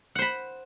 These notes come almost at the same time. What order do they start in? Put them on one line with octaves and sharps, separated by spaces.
F#5 C5 B5